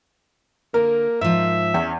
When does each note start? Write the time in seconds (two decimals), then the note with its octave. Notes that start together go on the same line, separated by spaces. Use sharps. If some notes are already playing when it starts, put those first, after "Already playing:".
0.74 D3 A#3 A#4
1.21 G#2 F3 E5
1.74 E2 C#4